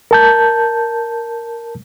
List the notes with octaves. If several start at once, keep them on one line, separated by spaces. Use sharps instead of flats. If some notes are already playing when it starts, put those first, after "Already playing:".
A#4 A5 G6